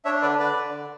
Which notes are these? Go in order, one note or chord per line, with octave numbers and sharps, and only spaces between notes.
D4 C#5 E5
D3 B4 D5
D3 B4 D5
D3